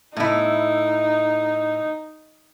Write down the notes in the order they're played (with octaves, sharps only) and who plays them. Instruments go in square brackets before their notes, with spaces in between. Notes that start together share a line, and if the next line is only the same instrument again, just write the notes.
[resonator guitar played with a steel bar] A2 E4 [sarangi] D#4